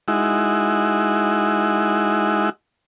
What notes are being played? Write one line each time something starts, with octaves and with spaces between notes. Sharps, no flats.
G#3 D#4 E4 F#4